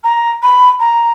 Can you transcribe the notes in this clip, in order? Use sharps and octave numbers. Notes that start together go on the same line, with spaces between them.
A#5
B5
A#5